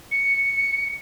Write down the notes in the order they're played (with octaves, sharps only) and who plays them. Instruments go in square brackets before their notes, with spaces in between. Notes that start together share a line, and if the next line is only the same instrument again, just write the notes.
[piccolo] C#7